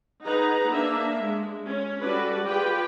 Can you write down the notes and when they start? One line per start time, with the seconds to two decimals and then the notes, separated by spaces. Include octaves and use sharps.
0.24 D#4 G#4 B4 F#5 A#5
0.68 A#3 D4 E5
1.21 G#3
1.66 C#4
2.02 G3 F#4 A4 B4 D5
2.45 F4 G4 G#4 B4 G5